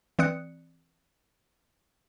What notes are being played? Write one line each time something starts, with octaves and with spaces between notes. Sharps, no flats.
E3 C4 D5 D#6 F#6 C#7